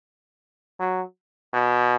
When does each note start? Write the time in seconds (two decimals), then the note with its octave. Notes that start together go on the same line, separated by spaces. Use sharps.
0.79 F#3
1.53 B2